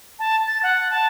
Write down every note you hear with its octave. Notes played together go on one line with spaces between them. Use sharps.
A5
A6
F#5
A5